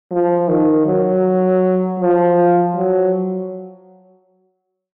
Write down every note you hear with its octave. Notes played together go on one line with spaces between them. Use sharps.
F3
D#3
F#3
F3
F#3